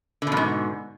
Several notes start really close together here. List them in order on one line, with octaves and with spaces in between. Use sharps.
D3 B2 F2 G#2